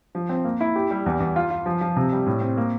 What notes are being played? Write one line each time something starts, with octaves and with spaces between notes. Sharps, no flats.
F3
C4
A#3
E4
G4
G3
E2
E2
F4
F4
F3
F3
C3
G3
A2
C4
A#3